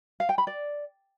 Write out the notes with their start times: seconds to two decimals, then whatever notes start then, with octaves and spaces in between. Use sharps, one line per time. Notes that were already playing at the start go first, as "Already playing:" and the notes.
0.20 F5
0.29 G5
0.38 B5
0.47 D5